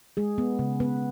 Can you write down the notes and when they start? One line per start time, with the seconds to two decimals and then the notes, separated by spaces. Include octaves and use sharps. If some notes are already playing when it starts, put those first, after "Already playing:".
0.17 G#3 G#4
0.38 B3
0.59 C#3
0.80 B3 B4